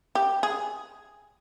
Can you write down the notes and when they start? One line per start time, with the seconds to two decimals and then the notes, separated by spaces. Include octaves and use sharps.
0.15 G4
0.43 G#4